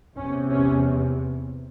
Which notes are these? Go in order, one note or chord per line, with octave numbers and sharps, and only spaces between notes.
E2 C3 C#4
C#4